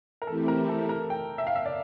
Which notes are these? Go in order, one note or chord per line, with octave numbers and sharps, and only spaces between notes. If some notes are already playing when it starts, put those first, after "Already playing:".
A#4
E3 A3 C4 E4 G4 A4
A#4
A4
A#4
G5
E5
F5
E5
D5